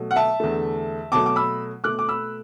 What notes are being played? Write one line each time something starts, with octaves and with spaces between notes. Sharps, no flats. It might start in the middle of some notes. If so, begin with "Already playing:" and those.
Already playing: B2 F#3 A3
F#5
E5 A5
E2 D3 A3
B2 F#3 A3 A5 D6
D6
B5 E6
B2 A3 D6 F#6
D6
B5 E6